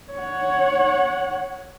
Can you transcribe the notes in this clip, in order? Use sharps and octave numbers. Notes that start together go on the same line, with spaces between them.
C#5 F#5